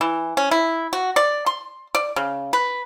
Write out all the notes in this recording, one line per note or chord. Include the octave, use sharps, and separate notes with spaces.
E3
C#4
E4
F#4
D5
C6
D5
C#3
B4